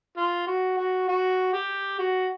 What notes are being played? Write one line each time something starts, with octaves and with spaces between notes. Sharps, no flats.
F4
F#4
F#4
F#4
G4
F#4